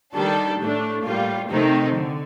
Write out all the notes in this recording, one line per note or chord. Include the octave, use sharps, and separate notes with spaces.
D#3 G3 D4 A4
A2 A3 D4
A2 G3 A#3 F4
C3 D#3 A3 C4 D#4
D3